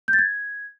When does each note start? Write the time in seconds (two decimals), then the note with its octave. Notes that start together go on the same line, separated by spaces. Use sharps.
0.08 G6
0.13 A6
0.19 G#6